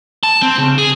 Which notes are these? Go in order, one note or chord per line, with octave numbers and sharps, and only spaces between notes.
A5
C4
C#3
G#4